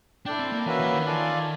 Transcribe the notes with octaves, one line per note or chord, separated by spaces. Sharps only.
D4 E4 A4 D5 G5
C4
A#3
E3 A#3 C#4 F#4 B4 E5
E3
D#3
F4 A4 D5 F5 G#5